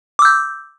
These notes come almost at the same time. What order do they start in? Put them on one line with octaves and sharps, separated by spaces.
D6 E6 G6